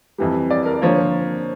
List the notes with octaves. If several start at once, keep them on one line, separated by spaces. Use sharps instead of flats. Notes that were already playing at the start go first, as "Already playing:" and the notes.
F2 E3 G3
D5
A#4
D3 F3 A#3 C#5